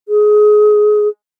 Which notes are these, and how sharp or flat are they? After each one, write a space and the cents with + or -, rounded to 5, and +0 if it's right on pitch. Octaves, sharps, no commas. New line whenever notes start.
G#4 +20